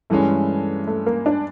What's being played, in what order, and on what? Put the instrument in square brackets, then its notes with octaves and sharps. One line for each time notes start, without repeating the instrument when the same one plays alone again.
[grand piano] G2 E3 G#3 C#4 [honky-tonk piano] A3
[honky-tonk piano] A3
A#3
D4